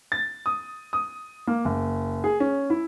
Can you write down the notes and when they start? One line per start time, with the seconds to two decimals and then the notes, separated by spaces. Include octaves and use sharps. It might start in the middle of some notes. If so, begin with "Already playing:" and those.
0.12 A6
0.46 D#6
0.93 D#6
1.47 A#3
1.65 F#1
2.24 G#4
2.40 C#4
2.70 E4